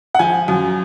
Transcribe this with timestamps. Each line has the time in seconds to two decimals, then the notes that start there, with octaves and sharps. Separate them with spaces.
0.15 F#5
0.19 F3 G#5
0.48 F#2